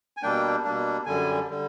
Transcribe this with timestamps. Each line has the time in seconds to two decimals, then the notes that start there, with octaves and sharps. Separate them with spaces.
0.17 G#5
0.23 B2 G3 A#3 D4 G5
0.64 B2 G3 A#3 D4
1.06 F#2 D3 G3 G#5
1.49 D3 G3